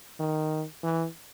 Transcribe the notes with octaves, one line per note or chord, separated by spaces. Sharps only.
D#3
E3